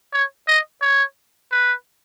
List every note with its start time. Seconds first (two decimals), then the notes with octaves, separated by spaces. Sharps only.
0.13 C#5
0.48 D#5
0.82 C#5
1.52 B4